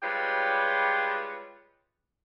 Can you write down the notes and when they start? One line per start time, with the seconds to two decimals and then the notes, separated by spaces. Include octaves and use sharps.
0.03 G3 G#3 F4 G4 B4 C#5